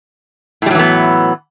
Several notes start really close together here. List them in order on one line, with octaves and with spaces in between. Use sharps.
A2 G3 F#3 E3 B3